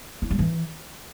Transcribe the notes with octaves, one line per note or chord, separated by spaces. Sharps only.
E4
G3
E3